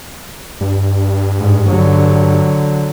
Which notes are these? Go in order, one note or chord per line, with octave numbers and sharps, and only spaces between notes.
G2
G#2
D3 F#3